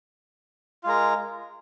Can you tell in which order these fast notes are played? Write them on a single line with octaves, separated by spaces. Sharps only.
F4 G#3 A#4